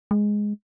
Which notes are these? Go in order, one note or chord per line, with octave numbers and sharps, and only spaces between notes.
G#3